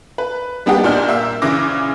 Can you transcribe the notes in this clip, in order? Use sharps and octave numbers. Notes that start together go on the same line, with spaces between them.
B4
G3 A#3 B3 D4 D#4 G4
A#1 A#2 D4 D5 F6 G6
A#3 E5 E6
A#1 C#3 E3 D6 A#6